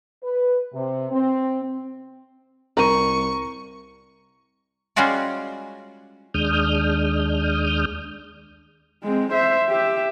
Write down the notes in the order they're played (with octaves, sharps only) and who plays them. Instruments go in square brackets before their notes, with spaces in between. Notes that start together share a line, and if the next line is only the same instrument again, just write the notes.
[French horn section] B4
C3
C4
[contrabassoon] C2 [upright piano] A#4 [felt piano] A#5 D#7 [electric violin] C#6
[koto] G3 G#3 C#4 F4 F#4 D5
[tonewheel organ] D#2 G#3 D4 D#6 F6 G6
[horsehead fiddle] G#3 C4
C5 E5
G4 E5